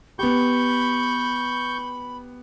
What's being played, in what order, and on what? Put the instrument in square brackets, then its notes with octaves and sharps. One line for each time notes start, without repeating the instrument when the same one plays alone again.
[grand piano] B3 G4 [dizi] B5 [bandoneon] C#6 G6